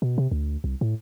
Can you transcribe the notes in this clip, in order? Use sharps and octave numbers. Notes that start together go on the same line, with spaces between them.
B2
C3
D2
C2
A2